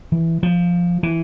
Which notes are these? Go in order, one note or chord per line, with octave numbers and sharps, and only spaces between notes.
E3
F3
E3